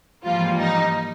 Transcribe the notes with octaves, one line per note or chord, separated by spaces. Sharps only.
G#2 E3 F3 G3 A#3 F4
D#4